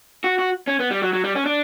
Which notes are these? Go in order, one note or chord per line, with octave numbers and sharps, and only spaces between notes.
F#4
F#4
C#4
B3
G3
F#3
F#3
G3
C#4
D4